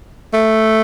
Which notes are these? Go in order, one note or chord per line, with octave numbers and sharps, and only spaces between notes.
A3